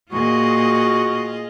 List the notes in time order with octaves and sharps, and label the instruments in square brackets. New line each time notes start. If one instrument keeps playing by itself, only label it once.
[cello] A#2 [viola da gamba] F4 G#4 D#5 [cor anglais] F#4